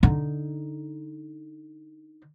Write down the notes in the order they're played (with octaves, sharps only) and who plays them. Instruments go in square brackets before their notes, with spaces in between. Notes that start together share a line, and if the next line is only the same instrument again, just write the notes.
[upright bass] D3 D#4